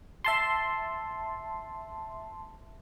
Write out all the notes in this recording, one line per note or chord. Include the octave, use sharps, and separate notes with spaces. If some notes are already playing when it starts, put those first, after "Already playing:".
E5 A5 C6